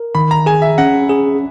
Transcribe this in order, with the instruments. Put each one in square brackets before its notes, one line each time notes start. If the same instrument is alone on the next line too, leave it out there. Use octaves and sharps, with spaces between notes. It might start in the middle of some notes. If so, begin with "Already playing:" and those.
Already playing: [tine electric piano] A#4
[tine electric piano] D#3 [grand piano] B5
[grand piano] A#5
[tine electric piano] G#4 [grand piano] G#5
[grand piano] E5
[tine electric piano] C#4 [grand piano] F#5
[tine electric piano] G#4